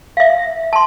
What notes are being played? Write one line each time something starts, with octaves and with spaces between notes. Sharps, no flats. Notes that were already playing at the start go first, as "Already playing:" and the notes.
E5 F5
A5 C6